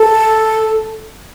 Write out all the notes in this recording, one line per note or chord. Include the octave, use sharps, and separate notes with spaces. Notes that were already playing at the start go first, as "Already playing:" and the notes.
Already playing: A4